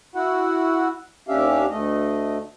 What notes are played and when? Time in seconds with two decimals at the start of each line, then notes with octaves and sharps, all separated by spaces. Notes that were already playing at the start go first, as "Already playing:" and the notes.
0.15 E4 F#4 F#5
1.28 D#2 C#4 D4 G4 E5 F5
1.70 D2 A3 D#5